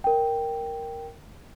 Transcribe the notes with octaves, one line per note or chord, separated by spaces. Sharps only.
A#4 G5